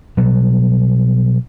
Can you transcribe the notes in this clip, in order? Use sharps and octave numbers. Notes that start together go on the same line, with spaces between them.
B2 F#3 G3